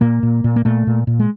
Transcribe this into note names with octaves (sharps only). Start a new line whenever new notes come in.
A#2 A#3
A#2
A#2
A#3
A#2 A3
A#2
A#2
G#3